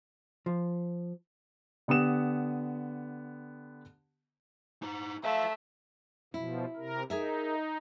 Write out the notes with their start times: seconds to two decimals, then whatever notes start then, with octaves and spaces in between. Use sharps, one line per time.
0.46 F3
1.88 D3 B3 G4 D#6 E7
4.82 D#4 C5
5.24 A3 C5 E5 F5
6.34 B2 F3 E4
6.76 C3 A#4
7.10 D#4 G#4 A#4 E5